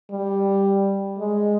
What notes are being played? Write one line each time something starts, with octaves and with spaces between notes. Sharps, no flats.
G3
G#3